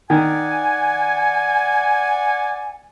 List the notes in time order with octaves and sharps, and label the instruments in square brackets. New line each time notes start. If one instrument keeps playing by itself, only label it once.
[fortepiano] D#3 [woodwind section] D5 F#5 G#5